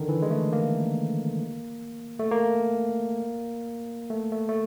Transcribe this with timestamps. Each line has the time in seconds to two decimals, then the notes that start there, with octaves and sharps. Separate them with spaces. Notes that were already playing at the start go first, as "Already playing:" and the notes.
Already playing: D3 D#3
0.09 E3
0.22 G#3
0.31 A3
0.53 A#3
2.19 A3
2.31 A#3
4.10 A3
4.32 A3
4.49 A3